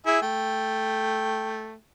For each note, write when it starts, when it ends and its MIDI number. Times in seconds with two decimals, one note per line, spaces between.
0.06 0.19 64
0.06 0.19 68
0.06 0.19 76
0.22 1.74 57
0.22 1.74 79